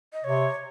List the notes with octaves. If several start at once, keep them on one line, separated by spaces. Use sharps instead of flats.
D#5
C3 C#5